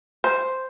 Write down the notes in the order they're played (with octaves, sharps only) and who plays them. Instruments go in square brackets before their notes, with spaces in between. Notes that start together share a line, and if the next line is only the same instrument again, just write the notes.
[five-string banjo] C5